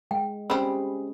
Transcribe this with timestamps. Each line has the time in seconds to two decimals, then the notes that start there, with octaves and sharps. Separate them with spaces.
0.11 G#3 G5
0.50 G3 C4 C#4 G4 G#4 B5